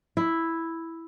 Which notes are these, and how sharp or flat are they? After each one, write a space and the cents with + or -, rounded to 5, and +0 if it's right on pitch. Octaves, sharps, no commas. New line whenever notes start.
E4 +0